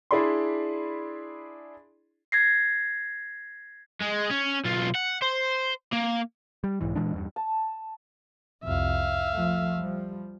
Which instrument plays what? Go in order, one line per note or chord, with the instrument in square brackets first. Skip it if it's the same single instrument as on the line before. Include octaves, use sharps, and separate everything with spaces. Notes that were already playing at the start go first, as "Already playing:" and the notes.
[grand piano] D4 E4 G#4 D5 B5 C6
[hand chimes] G#6 A#6 C7
[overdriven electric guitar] G#3
C#4
B1 F4
F#5
C5
A#3
[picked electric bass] G3
B1 G#2 E3
A#2 E3 G#3 D4
E2 G2
[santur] A5
[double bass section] C2 F2 [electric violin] E5 F5
[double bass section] F3 A3
F3 G3